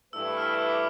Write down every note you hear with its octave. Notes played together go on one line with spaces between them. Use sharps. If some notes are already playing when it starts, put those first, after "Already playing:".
G2 E3 A3 E4 B4 E6
F6
E6
E6
D6